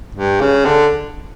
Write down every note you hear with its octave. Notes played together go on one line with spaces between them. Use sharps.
G2
C#3
D3